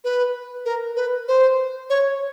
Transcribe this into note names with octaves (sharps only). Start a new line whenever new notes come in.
B4
A#4
B4
C5
C#5